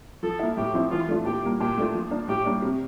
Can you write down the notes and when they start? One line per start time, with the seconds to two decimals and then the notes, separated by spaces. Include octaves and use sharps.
0.23 F3 A4
0.39 A#3 E4
0.57 A2 G4
0.74 F3 C4 E4
0.91 E3 F4
1.08 A3 D4 F4
1.25 A#2 G4
1.43 G3 A#3
1.60 A#2 G4
1.78 A3 D4 F4
1.94 F3
2.11 A#3 D4
2.28 A2 G4
2.45 G3 A#3 D4
2.62 C3